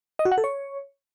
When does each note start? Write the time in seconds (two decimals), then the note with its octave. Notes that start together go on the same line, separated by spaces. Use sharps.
0.19 D#5
0.25 F#4
0.32 F#5
0.38 A4
0.44 C#5